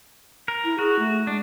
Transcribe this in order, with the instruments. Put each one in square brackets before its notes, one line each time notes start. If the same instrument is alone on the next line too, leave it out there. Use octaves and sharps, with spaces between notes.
[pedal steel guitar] A#4
[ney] E4
[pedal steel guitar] F#4 [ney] G#4
[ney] A3
[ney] G#3 [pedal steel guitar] D4